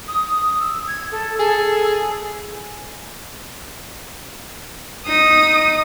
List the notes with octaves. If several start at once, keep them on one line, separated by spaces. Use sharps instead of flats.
D#6
E6
G#6
A4
G#4 A4
D#4 D#6